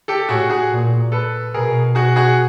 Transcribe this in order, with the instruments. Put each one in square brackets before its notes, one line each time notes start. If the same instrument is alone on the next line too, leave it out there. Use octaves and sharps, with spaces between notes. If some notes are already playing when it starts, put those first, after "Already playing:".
[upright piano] G4 A4
[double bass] A2 [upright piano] F#4 G#4
[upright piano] F#4 G#4
[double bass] A#2
[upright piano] A4 B4
[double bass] B2 [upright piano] G#4 A#4
[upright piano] F#4 G#4
F#4 G#4